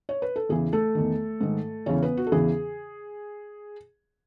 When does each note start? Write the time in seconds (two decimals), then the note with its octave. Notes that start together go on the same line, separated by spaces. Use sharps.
0.09 C#5
0.22 B4
0.36 A4
0.49 E2 C#3 E3 G#4
0.73 A3 A4
0.95 E2 D#3
1.41 G#2 D#3
1.86 E2 C#3 E3 C#4 C#5
2.02 B3 B4
2.17 F#4
2.27 A4
2.32 E2 C#3 E3 G#4